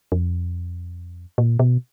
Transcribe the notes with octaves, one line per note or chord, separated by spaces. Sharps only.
F2
A#2
B2